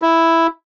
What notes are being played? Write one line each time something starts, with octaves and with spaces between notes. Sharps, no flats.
E4